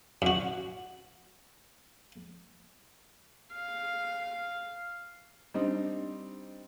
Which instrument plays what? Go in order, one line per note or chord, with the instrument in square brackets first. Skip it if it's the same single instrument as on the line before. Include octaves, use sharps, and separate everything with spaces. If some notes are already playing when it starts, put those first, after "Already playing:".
[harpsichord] F#2 F#4
[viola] F5
[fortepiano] G3 C4 D4 D#4